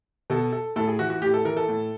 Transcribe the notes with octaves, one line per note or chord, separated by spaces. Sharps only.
B2 A4
A4
A2 A4
G#4
E3 F#4
F#4
A2 G4
A4
E3 A#4
A4
A2